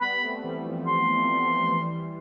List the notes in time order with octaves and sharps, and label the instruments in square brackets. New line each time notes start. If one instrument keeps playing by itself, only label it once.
[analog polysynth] G3 B3 [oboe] B5
[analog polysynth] A3 C4
E3 G3
F3
[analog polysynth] F3 [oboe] C6
[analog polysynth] F3
F3
E3 G3